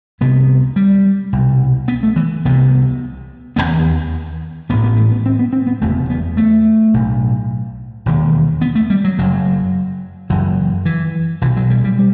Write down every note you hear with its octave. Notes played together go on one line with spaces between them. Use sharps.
C2 C3 B3
G3
C2 B2
B3
A3
E3
C2 C3 B3
E1 D#2 B3
A1 A2 B3
B3
A3
B3
C4
B3
C4
B3
F#1 E2 C3 A3
B3
A3
B1 A2
E1 D#2
B3
A3
G3
F#3
F#1 F#2 F#3
F#1 F#2 E3
E3
B1 B2 E3
F#3
G3
G3
G3